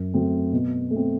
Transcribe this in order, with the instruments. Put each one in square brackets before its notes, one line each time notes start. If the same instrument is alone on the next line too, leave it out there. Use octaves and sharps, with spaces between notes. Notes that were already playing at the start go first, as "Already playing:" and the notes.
Already playing: [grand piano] F#2
F#3 A3 C4
B2
A3
C4